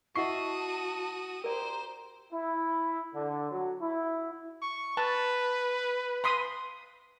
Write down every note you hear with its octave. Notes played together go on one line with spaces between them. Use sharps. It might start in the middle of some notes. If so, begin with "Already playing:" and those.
E4 F#4 D#5 F#5 A5 C#6 D#6 C7
G4 A#4 C5 D5 A#5
E4
D3
F#3
E4
C#6
B4 A5
B5 C6 D#6